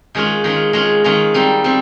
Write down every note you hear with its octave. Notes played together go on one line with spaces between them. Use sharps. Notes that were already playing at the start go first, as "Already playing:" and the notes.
D#3 G#3 C#4 F4
D#3 G#3 C#4 F4
D#3 G#3 C#4 F4
D#3 G#3 C#4 F4
G3 C4 D#4
G3 C4